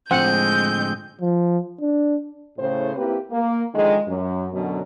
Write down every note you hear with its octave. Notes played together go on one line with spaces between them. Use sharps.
A2 D3 F3 G#3 C4 F#5 G6
F3
D4
A2 C#3 C5
A#3 C4 E4 G4 A#4 B4
A#3
D3 D#3 F3 G#3
F#2
F#2 B2 D3 F#3